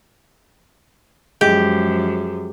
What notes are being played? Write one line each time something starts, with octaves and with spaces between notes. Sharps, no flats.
F#2 F3 G#3 G4